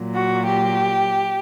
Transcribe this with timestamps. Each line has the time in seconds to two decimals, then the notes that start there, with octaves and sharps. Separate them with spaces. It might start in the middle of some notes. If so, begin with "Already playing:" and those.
Already playing: A#2 F#3
0.15 F#4
0.48 G4